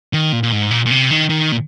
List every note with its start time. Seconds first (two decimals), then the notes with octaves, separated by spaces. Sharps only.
0.13 D#3
0.32 A#2
0.43 A#2
0.52 G#2
0.71 A#2
0.86 A#2
0.91 C3
1.11 D#3
1.29 D#3
1.52 A#2